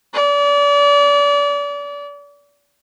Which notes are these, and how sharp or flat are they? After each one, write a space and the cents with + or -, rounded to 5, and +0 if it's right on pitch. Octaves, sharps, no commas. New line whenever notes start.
D5 -35